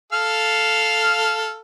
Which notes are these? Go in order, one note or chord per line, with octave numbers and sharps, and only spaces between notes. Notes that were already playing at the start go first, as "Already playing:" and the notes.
A4 F5 F6